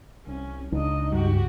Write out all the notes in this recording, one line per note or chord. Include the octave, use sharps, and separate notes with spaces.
C2 C#4
C#2 D4 D#4 D#5
G2 F#4 G4